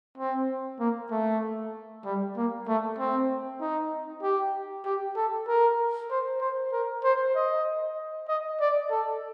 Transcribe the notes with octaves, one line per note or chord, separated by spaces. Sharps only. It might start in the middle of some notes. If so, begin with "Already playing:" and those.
C4
A#3
A3
G3
A#3
A3
C4
D#4
G4
G4
A4
A#4
C5
C5
A#4
C5
D#5
D#5
D5
A4